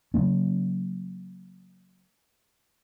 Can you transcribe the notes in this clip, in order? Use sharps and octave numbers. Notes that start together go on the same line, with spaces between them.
C#3 F#3 A#3 C#4